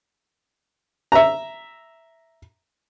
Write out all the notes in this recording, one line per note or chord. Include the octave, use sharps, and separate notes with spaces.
E5 A#5